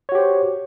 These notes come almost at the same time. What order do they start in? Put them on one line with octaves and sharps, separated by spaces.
C#5 F#4 G4 C5